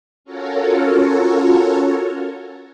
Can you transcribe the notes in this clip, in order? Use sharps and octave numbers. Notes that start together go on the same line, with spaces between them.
C#4 F4 F#4 A4 A#4 C#5